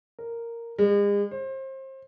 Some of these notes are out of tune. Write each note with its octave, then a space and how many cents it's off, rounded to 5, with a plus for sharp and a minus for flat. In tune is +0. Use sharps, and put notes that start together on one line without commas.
A#4 -5
G#3 -40
C5 +30